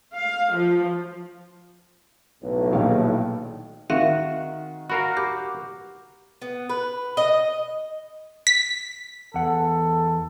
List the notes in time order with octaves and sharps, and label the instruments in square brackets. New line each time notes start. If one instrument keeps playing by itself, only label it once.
[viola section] F5
F3
[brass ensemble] B1 A2
[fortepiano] A#1 D#3 F5
[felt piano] D#3 [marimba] C4 E5 F5 [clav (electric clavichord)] F#4
[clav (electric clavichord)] F#4 A#4 F5 [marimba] B5
[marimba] G4 D6
[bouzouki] B3
B4
D#5
[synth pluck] B6
[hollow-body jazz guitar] E2 F#5 [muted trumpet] A4